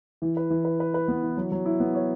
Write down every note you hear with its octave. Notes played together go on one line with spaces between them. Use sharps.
E3
B4
E3
B4
B4
B4
B3
E3
F#3
F#3
E4
B3
C#5